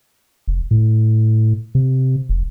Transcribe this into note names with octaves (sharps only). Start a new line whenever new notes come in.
F1
A2
C3
F1